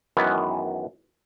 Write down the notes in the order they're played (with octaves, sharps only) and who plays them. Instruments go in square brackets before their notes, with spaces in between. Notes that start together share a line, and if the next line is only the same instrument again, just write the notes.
[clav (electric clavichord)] F#2 D#3 E3 G#3 B3